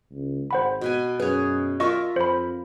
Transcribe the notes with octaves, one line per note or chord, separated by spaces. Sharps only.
C#2
G#1 C5 F#5 B5
B2 B4 G#5
F#2 G#4 B4 C#5
F4 A#4 D#5 E5 C#6
F2 C5 B5